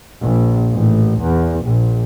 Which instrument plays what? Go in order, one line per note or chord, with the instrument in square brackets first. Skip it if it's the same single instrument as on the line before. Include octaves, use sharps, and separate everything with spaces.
[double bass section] A#1
A1
E2
A#1